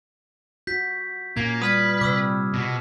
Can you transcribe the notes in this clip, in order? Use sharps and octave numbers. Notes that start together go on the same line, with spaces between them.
F#4 G6 B6
A#2 A#3 C#4 G#6
G3 B4 D#6 F6 G#6
C3 D6 E6 F6
B2